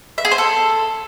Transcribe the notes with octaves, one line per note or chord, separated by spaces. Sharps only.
E5
G#4
C5
A4